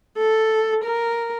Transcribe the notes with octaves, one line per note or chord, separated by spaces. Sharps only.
A4
A#4